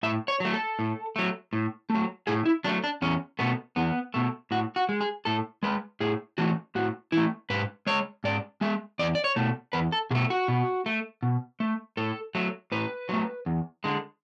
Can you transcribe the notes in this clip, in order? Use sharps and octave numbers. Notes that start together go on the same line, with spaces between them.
A2 E5
C#5
F#3 A3
A4
A2
F#3 A3
A2
F#3 A3
A2 G#4
E4
F#3 A3 D4
D4
E2 C#4
B2 A3 B3
E2 B3
B2 A3
A2 F#4
F#4
G#3
G#4
A2 A4
G#3 B4
A2 G#4
E3 A3 F#4
A2 F#4
E3 A3 E4
G#2 B4
G#3 C#5
G#2 D5
G#3 E5
E2 D5
D5
C#5
B2 A3
E2 B4
A4
B2 A3 G#4
F#4
B2
A3
B2
A3
A2 A4
F#3 A3
A2 B4
F#3 A3
E2
D3 G#3